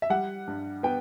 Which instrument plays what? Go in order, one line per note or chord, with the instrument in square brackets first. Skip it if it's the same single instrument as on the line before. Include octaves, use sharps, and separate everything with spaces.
[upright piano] E5
G3 F#5
G2
B3 G5